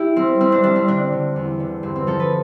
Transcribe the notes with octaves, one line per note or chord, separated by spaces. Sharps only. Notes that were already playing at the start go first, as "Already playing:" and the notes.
Already playing: D4 E4 G4
G3 C4
G3 C4
D4
G3 D4
C4
D3 D4
D3
E2
D3
G2 C4
C4
F3 A4
B4